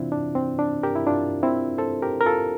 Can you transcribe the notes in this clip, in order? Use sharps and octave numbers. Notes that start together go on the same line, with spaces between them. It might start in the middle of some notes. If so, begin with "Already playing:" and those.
Already playing: C3 E3 C4 D4 E4 F4
D4
C4
D4
G4 A#4
E4
D4 F4
C4 E4
A4 C5
G4 A#4
A#4
F4 A4